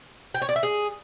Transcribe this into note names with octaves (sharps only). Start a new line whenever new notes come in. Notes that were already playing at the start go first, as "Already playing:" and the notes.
G5
C#5
D5
E5
G#4